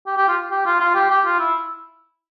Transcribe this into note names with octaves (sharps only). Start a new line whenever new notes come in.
G4
G4
F4
G4
F4
F4
G4
G4
F4
E4